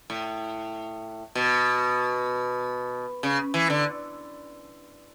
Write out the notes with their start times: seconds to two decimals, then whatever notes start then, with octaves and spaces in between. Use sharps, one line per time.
0.10 A2
1.35 B2
3.23 C#3
3.54 E3
3.70 D3